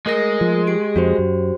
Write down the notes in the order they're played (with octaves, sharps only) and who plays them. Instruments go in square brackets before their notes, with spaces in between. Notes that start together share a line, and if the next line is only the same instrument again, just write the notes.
[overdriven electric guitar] G#3 [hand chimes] A3 A#4 A#6
[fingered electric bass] F3
[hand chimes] G4 D7
[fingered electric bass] F2 [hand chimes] F#4 G4 C5
[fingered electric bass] F#2